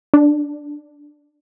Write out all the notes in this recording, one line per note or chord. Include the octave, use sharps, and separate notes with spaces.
D4